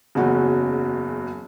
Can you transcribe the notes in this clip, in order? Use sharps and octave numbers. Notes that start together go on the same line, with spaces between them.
F#1 E2 C#3 F#3 F#4